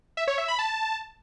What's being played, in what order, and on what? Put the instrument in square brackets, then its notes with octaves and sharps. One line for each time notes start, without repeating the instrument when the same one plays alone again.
[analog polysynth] E5
C#5
E5
B5
A5